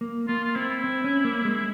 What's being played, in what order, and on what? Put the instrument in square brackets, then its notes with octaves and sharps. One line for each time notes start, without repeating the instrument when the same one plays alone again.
[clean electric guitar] A#3
[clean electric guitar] A#3 [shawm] F4
[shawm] F4
[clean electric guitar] C4 [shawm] E4
[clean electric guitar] C4
C#4
A#3
G#3